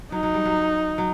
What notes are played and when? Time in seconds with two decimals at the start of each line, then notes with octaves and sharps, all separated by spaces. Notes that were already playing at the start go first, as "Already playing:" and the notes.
0.12 F#3 D#4
0.23 F#3
0.34 G3
0.45 F#3
0.98 F#3